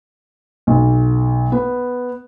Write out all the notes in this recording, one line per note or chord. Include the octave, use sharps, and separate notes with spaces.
B1
B3